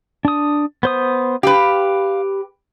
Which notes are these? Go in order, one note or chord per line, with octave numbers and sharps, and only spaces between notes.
D4 D#6
B3 C5 D#6
G4 B4 F5